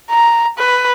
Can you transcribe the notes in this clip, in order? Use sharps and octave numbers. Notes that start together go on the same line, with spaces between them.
A#5
B4